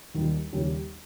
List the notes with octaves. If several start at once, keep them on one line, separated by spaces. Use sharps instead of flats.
D#2 D#3 G3
D#2 C#3 G3 C#4 G4